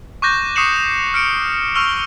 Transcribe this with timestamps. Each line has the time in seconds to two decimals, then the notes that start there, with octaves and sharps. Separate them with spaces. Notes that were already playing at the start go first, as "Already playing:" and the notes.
0.22 C#6 D6 F#6 G6 A#6
0.55 C#6 D#6 C7 C#7 E7 F#7
1.14 F6 C#7 D7
1.75 C#6 E6 F6 F7 G7